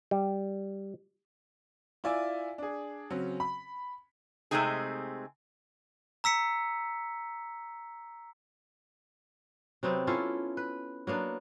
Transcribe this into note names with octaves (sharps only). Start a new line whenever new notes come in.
G3
E4 F4 D5 E5 G#5
D4 G#4
C#3 F#3 C4 C#4
B5
C3 G#3 A3 C4 D#4 G#4
A#5 E6 B6 C#7
C3 F#3 B3 C4
C#4 E4 F4 A4
B4
F#3 A#3 B3 D4